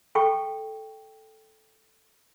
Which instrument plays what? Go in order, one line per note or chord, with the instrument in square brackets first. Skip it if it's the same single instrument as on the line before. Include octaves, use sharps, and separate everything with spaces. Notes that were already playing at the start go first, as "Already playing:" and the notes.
[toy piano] A4 G5 C#6